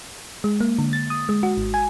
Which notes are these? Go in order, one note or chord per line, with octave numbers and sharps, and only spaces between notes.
G#3
A#3
D3
A6
D#6
G#3
F#4
G#1
G#5